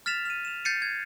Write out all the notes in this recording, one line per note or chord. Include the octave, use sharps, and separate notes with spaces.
F6 A6 B6 E7 F7
F6 D#7
E7 F7
G6 A6 C7 C#7 D#7
G#6